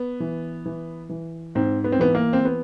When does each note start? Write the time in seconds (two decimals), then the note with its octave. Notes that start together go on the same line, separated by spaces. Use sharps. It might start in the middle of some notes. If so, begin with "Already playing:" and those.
Already playing: B3
0.20 E3
0.66 E3
1.10 E3
1.55 G#2 C4
1.84 B3
1.92 C4
1.99 E3 B3
2.15 A#3
2.33 C4
2.45 B3